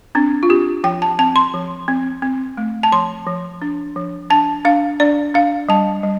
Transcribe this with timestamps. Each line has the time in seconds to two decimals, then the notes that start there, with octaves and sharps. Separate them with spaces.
0.15 C4 D4
0.43 F4
0.49 C4 G4
0.84 F3 G5
1.02 A5
1.19 C4 A5
1.36 C6
1.54 F3
1.88 C4
2.22 C4
2.57 A3
2.83 A5
2.92 F3 C6
3.27 F3
3.62 D4
3.96 F3
4.30 D4 A5
4.65 D4 F5
5.00 D4 D5
5.34 D4 F5
5.69 G3 A5
6.03 G3